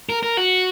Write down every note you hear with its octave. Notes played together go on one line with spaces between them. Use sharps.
A#4
A#4
F#4